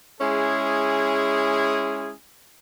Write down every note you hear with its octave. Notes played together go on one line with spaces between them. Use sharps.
G#3 C#4 E4 G#4